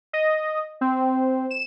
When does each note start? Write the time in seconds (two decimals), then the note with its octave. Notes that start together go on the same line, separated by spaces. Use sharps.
0.13 D#5
0.81 C4
1.51 E7